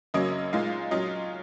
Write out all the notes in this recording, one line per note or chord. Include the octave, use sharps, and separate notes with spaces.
F#2 C#3 F#3 A#3 C#4 D#5
A#2 G#3 D#4 F5
A#2 F#3 C#4 F4 D#5